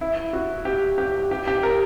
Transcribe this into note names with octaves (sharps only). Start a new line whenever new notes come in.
E4
F#4
G4
G4
G4
G4
A#4